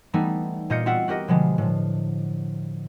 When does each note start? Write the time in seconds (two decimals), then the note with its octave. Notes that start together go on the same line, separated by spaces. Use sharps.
0.13 E3 G3 A3 B3 D#4
0.70 A#2 F4 D#5 G6 C#7
0.86 C4 F4 F#4 E5 F#5
1.08 F#4 G4 A#4 D#5
1.28 B2 D3 F3 G3 G#3
1.58 A2 F3